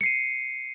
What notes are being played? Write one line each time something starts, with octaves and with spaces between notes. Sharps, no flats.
C7 C#7 D#7